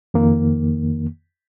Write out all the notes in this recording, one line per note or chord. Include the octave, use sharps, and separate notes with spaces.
F2 D#3 A#3